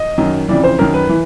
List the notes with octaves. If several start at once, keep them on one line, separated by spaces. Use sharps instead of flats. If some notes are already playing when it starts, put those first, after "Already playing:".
Already playing: D#5
F#2 D#3
F2 C#3 E3 D5
C5
F#2 D#3 A#4
B4
E3